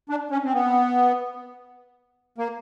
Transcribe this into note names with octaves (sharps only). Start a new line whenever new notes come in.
D4
C#4
C4
B3
A#3